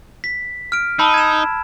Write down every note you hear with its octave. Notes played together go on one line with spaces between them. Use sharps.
B6
F6 D7
D#4 A5 B5 E6
G#6 E7